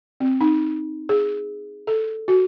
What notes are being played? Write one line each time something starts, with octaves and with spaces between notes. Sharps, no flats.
C4
D#4
G#4
A4
F#4